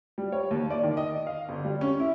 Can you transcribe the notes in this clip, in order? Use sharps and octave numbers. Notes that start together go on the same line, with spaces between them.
G3
C#5
D#2
D5
D#3
D#5
F5
G1
G3
C#4
E4